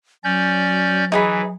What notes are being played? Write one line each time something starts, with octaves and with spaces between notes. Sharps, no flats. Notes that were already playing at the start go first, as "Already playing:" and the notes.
F#3 C#4 D5 G6
E3 D#4 G#4 B5